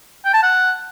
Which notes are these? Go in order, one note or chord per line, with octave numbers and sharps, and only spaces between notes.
G5
A5
F#5